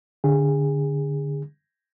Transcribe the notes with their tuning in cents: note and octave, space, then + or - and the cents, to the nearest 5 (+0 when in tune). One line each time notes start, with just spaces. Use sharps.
D3 -5 G#4 -25